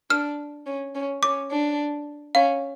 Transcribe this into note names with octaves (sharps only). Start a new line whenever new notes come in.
D4 F6
C#4
C#4
C#4 D6
D4
C#4 F5